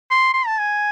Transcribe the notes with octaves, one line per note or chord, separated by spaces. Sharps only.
C6
C6
A5
G#5